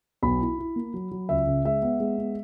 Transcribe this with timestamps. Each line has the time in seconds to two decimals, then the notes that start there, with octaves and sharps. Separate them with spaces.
0.22 B1 B5
0.40 E4
0.58 E4
0.76 A#3
0.94 F#3
1.11 F#3
1.29 C#2 E5
1.47 C#3
1.65 G#3 E5
1.82 B3
2.00 G#3
2.18 B3